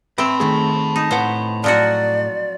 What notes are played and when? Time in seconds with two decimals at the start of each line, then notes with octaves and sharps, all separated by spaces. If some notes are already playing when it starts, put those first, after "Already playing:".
0.18 C4 B4 E5 A5 B5 C6
0.40 D#3 A3 G#4
0.96 D#4
1.11 A2 B4 C5 F#5
1.64 F3 F#3 F#4 D5